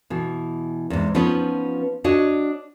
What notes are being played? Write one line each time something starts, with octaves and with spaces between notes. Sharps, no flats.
B2 E3
E2 G#2
F3 B3 C#4 D#4 B4
D4 F#4 C#5 D#5